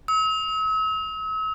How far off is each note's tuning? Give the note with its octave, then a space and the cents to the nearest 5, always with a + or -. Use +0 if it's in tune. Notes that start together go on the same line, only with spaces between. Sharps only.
E6 -45